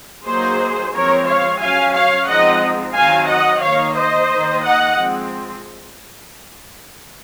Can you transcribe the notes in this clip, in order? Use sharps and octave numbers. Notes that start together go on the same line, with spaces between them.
F#3 A#3 D#4 G#4 C5
F3 G#3 C4 A#4 C#5
C#5 F5
F#3 C#4 F5 G#5
C#5 F5
F3 G#3 C4 D#4 D#5 F#5
D#3 F#3 C4 F5 G#5
D#5 F#5
D#3 A#3 D#4 C#5 F5
C5 D#5
D#3 A#3 D#4
D#5 F#5
F3 G#3 C4